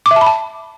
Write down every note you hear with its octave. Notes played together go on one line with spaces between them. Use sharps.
D6
E5
A5
B5
A5